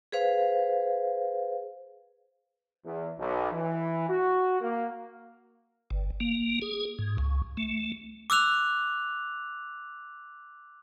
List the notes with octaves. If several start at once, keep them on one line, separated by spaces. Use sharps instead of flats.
G#4 B4 C5 F5
E2
B1
E3
F#4
A#3
G1
A#3
G#4
G#2
C#2
A3
D6 E6 F#6 F7